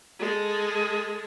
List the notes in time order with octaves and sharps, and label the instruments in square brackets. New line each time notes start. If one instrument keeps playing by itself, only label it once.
[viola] G#3 A4